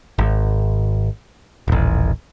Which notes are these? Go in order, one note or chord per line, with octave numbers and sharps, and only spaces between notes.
G#1
D#1 A1